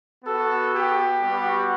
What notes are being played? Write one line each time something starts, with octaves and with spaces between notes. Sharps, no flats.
B3 F#4 A4
G4
G3 B3 F#4